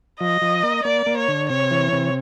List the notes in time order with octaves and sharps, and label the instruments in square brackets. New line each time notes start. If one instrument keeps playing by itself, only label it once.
[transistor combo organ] F3 [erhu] D#5
[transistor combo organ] F3
A#3
[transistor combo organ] A#3 [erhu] D5
[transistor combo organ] A#3
[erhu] C#5
[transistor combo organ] D3
[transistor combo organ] C3 [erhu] C#5
[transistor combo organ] E3
C3